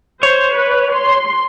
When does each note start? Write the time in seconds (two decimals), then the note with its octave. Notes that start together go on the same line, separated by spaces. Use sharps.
0.23 C5 C#5
0.56 B4
0.93 C6